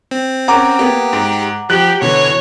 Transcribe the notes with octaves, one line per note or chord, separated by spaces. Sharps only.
C4
C#4 A#4 F#5 A#5 D6
A#3 B3 G4
G#2
F3 G4 F#6 F#7
B2 D3 E3 C#5